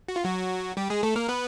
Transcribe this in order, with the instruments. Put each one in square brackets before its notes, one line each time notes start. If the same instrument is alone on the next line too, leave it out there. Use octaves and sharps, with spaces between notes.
[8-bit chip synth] F#4
F4
F#3 F#4
G3 G4
G#3 G#4
A3 A4
A#3 A#4
B3 B4